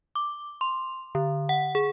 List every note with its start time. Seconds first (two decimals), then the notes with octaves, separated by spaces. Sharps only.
0.15 D6
0.61 C6
1.15 D3
1.49 F#5
1.75 G#4